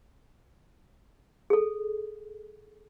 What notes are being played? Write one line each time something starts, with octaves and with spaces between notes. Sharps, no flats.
G#4 A4